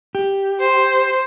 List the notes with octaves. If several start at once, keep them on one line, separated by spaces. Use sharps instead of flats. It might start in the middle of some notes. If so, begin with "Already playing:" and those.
G4
C5